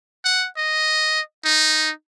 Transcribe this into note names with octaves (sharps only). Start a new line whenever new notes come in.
F#5
D#5
D#4